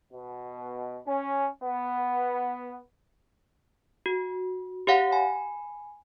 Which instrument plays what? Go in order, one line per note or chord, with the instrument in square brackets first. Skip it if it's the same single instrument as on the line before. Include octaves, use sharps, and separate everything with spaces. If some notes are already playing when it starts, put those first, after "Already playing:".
[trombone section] B2
C#4
B3
[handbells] F#4
G4 C#5 F5 F#5
G#5 B5